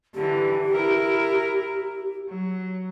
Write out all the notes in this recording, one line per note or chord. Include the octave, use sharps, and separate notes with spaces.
D3 E3 G4
E4 A#4
F#3